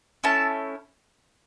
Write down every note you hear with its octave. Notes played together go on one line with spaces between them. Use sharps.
A3 C#4 E4 A5